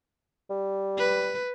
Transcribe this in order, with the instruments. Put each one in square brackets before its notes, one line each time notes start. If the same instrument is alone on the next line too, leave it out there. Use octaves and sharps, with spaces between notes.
[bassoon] G3
[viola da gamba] B4